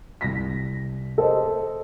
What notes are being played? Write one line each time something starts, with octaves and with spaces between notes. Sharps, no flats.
C2 A#6 B6
A4 C5 D#5